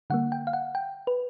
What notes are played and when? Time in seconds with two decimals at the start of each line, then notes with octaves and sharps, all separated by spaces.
0.10 D3 G3 A#3 F#5
0.32 G5
0.47 F5
0.53 F#5
0.75 G5
1.07 B4